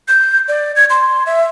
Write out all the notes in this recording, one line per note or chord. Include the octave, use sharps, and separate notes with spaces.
G6
D5
G#6
C6
E5